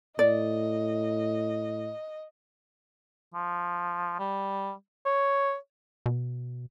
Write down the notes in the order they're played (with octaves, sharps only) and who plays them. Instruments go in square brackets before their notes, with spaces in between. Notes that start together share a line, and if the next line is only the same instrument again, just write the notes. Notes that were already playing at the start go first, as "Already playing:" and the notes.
[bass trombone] A2 [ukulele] D5 [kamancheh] D#5
[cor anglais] F3
G3
C#5
[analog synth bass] B2